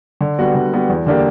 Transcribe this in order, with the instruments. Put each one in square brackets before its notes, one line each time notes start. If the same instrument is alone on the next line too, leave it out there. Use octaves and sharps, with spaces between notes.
[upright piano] D3
G3 B3 F#4
D3
G3 B3 F#4
E2
D3 A#3 D4 G4